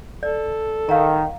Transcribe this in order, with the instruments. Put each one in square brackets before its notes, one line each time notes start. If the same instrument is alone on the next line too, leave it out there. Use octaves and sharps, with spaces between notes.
[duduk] A4 [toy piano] D5
[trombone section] D#3 [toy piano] F5 F#5 A#5